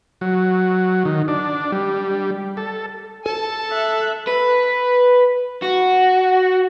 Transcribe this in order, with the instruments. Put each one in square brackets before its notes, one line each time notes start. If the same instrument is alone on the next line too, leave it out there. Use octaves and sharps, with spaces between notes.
[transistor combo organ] F#3
D#3
D4
G3
A4
[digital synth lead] A4 [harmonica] A5
[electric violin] E5 F#6
[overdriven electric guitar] B4
F#4